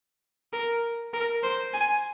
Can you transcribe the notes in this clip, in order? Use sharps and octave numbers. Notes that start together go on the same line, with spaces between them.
A#4
A#4
C5
G#5